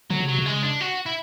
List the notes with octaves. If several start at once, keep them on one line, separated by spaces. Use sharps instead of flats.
D3 F#3
C#3
C3 F#3
C#3
G#3
D4
F#4
E4